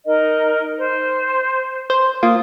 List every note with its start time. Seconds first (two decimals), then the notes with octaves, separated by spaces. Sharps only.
0.05 D#4 A#4 D#5
0.79 C5
1.90 C5
2.23 A#3 F4 D#6